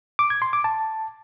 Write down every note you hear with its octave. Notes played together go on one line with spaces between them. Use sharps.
D6
G#6
C6
D6
A5